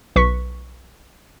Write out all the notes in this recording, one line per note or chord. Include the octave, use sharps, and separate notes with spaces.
B1 B4 C#6 B6